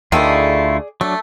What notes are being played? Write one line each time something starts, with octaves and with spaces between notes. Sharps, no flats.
D2 D#3 A3 E4 F4 G#4 D5
F#3 A3 D4